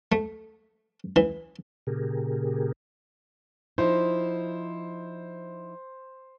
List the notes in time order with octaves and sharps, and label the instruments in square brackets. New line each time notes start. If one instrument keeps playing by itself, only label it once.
[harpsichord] A3
E3
[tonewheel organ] A#2 C#3 G4 G#4 A#4
[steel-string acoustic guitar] F3 D#4 E4 [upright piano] C5